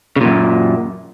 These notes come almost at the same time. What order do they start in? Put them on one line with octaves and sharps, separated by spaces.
C#3 A#2 F#2